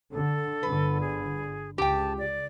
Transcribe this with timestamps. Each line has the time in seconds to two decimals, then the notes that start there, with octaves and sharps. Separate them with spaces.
0.12 D3 A4
0.63 G1 D3 B4
1.01 G#4
1.78 C#2 G4 G5 A5
2.19 D5